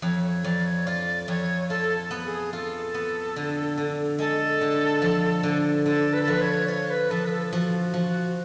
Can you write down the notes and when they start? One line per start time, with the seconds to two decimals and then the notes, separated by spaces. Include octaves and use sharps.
0.02 F2 C#5
0.23 C#5
0.44 F2 D5
0.66 C#5
0.86 F4 D5
1.28 F2 C#5
1.69 F4 A4
2.11 B3
2.25 G#4
2.53 F4 A4
2.94 B3
3.36 D3
3.78 D3
4.19 G#3 A4
4.61 D3
5.02 F3
5.43 D3
5.86 D3 A4
6.13 B4
6.22 A4
6.27 F3 B4
6.41 C#5
6.68 F4 C#5
6.90 B4
7.10 F3 A4
7.25 B4
7.31 A4
7.52 F3 F#4
7.80 F#4
7.94 F3
8.08 F#4